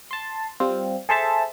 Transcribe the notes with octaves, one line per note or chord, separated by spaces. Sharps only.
A5 C6
G3 C4 F4
G#4 A4 C5 E5 A5